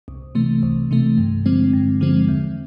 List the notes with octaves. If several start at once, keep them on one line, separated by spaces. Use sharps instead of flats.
C2
C3 E3 A3
C2
C3 E3 A3
G2
D3 F3 G#3 C4
G2
D3 F3 G#3 C4
E2